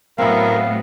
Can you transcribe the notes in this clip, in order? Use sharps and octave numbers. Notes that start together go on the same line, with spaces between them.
A2 F#3 B3 C4 E4 A#4 F5